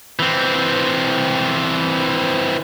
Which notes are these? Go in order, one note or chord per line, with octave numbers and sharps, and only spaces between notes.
E3 C4